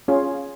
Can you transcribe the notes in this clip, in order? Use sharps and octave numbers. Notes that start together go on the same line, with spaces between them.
C#4 F4 G#4 C#5